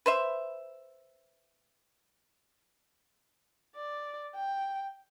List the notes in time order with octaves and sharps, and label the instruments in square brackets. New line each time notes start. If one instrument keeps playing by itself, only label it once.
[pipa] B4 C5 E5
[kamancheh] D5
G5